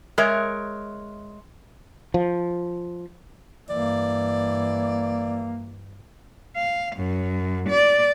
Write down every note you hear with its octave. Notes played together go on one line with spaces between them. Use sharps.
G#3 A#4 C#5 E5
F3
G2 E3 A#3 D5
F5
F#2
D5